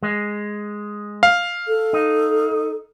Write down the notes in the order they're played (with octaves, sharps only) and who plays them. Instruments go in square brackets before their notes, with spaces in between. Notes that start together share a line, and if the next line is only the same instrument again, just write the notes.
[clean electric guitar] G#3
[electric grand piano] F5
[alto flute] A4
[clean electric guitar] D#4